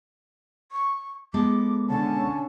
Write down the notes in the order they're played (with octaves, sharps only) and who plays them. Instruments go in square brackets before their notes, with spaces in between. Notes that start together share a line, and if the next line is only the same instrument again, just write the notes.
[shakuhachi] C#6
[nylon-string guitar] G#3 B3 A4 [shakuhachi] D6
[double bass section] D3 C#4 [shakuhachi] A5